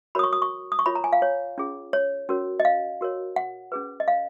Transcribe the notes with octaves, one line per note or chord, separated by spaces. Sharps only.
F#4 A#4 C#5 B5 D#6
C#6
D#6
C#6
D#6
C#6
F4 A#4 C#5 B5
A#5
G#5
F5
C#5
C#4 F4 G#4
C#5
C#4 F#4 A#4 C#5
D#5
F5
F#4 A#4 C#5
F#5
C#4 G#4 B4
D#5
F5